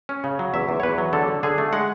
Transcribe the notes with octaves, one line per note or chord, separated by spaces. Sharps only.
C#4
C#3
F#3
E2 E5
E2
C#5
E2 B4
F#3
D3 A4
D3
D3 G#4
A3
G#3 F#5